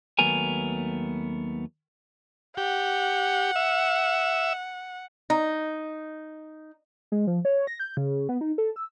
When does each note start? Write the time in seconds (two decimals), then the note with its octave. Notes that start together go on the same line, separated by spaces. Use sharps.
0.19 D#2 F#3 A3 B3 A#4 G#5
2.57 G4 F#5
3.56 E5
5.30 D#4
7.12 G#3
7.27 F3
7.45 C#5
7.67 A#6
7.80 G6
7.97 C#3
8.29 B3
8.41 D#4
8.58 A4
8.76 E6